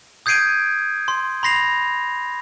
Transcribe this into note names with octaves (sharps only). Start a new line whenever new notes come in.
D#6 G6 G#6 C7 D7 D#7
C6
B5 C6 A#6 C7 F7